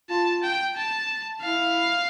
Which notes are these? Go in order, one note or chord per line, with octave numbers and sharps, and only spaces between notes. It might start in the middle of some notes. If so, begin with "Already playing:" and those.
F4 A5
G5
A5
E4 F5